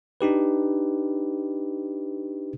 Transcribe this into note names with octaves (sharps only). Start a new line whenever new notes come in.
D4 D#4 G4 B4